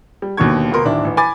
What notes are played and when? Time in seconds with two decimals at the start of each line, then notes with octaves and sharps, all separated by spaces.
0.22 G3
0.37 D#2 B2 D3 D#3 C#6 G#6
0.71 D2 B2 B3 A#4 C6
0.84 D1 D#3 D4 E4
1.05 A1
1.17 G#5 B5 D6 A6